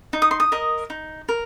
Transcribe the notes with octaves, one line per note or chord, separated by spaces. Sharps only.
D#4
D#6
C6
D#6
A#4 D#5
D#4
A#4